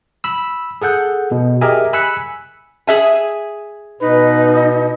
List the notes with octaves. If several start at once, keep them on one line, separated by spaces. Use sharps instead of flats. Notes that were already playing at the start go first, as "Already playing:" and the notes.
B5 E6
G#4 A4 F#5 G6
B2
G4 G#4 A#4 D#5 E5 G#5
G#5 B5 E6 F#6 B6 C#7
G#4 E5 G#5
B2 D#4 B4